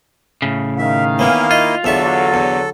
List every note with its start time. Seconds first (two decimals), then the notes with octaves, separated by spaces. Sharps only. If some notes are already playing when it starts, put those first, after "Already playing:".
0.42 A2 C#3
0.78 D#3 E5 F5
1.19 E3 A#3 B3 C#4 E4
1.51 F4 D#5
1.84 E2 D3 F#3 A4 E5 C#6
2.34 E2